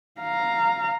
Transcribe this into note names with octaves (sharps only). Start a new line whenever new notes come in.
F5 A#5